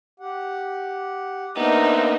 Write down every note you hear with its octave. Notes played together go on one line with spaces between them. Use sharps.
G4 F#5
A#3 B3 D4 D#4 C5 E5